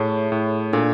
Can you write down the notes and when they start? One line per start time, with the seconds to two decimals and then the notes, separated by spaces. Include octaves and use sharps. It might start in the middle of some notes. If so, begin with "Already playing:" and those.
Already playing: A2 G#4 C#5 E5 A5
0.32 A2
0.73 A#2 D4 F4 A4